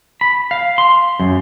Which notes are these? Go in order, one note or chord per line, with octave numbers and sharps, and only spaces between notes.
B5
F5
C6
F#2